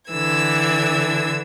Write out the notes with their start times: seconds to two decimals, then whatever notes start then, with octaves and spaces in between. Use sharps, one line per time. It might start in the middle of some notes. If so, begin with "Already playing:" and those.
0.11 D3 E3 E6 G#6